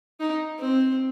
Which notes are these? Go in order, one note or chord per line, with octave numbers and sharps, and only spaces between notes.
D#4
C4